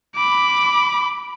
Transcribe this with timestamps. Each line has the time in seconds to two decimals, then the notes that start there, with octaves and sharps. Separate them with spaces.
0.15 B5 D6